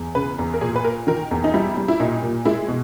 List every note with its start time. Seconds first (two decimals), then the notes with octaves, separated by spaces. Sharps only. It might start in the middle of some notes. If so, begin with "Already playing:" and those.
Already playing: E2
0.15 C#3 B4
0.39 E2
0.53 A#4
0.61 A#2 G#4
0.76 B4
0.84 A#3 A#4
1.07 D#3 A#4
1.31 E2
1.44 D#4
1.54 G3 E4
1.77 G3
1.88 E4
2.00 A#2 D#4
2.23 A#2
2.45 G#3 E4
2.68 B2